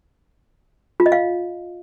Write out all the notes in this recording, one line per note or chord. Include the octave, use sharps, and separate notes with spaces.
F4
D#5
F5